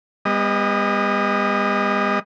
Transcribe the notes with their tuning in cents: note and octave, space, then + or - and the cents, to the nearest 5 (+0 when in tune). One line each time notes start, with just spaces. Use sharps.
G3 +45 B3 +0 D#5 +0